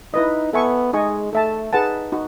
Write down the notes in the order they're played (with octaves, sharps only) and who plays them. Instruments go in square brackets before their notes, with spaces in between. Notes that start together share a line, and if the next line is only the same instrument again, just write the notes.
[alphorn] D#4 [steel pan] E4 B4 D#5
[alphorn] B3 [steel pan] A4 E5 G#5 C#6
[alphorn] G#3 [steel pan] D#4 G#4 D#5 G#5 C#6
[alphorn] A3 [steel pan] A4 E5 A5
[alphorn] D#4 [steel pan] G#4 B4 F#5 A5
[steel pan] D#4 F#4